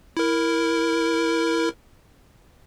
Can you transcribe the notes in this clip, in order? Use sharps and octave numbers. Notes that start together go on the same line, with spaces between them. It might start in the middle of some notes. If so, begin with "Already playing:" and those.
E4 A#4